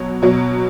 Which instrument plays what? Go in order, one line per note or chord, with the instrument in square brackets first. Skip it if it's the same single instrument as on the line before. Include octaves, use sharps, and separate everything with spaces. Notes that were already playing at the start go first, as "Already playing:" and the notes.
Already playing: [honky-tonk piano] B2 F#3 C#5
B2 F#3